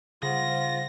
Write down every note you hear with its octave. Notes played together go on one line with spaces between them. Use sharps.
C#3 G3 F4 C5 F#5 A#6